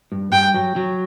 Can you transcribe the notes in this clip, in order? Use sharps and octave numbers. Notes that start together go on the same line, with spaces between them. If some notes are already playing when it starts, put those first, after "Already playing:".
G2
G2 G5
F#3
F#3